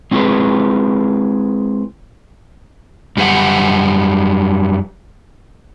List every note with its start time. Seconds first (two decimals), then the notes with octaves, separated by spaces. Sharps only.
0.11 G#3 C4 E4 F#4 G#4 B4
3.17 F#2 G3 G4 B4 F#5